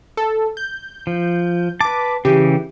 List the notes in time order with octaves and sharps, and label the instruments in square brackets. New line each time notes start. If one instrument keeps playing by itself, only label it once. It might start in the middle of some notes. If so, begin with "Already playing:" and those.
[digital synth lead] A4
G6
[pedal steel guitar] F3
[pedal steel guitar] B4 A5 [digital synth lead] D6
[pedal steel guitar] C#3 E3 [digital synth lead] G4